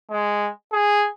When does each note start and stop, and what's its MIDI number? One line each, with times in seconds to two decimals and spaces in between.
0.11 0.50 56
0.72 1.09 68